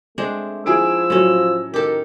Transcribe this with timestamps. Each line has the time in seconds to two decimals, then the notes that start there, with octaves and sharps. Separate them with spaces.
0.18 G#3 A3 C4 D4
0.66 F3 E4 G#4 E6 D7
1.10 A2 F#3 C#4
1.74 D#3 G4 A4 A#4